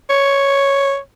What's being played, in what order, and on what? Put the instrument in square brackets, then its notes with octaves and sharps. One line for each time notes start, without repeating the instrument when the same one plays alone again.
[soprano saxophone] C#5